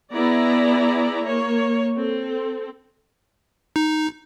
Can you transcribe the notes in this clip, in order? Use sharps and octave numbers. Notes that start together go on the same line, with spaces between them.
B3 E4 G#4 D5 E5 A#5
A#3 C#5
C4 A4
D#4